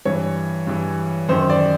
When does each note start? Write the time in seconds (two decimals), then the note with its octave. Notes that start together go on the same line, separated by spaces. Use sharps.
0.05 G2 E3 C#5
0.67 G2 E3
1.29 F#2 D#3 C5
1.50 D5